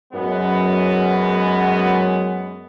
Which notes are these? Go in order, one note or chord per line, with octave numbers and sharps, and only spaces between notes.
F#2 G#3 B3